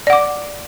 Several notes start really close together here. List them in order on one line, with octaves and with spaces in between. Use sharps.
D5 F#5 D6